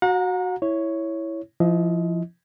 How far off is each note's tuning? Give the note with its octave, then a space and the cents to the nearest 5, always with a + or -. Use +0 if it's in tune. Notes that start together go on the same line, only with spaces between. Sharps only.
F#4 +0 F#5 -40 A#5 +0
E4 +0 C#5 +0
F3 -20 E4 +0 D#5 +25